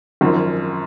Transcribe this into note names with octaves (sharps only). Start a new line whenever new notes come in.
G#1 F#2 F3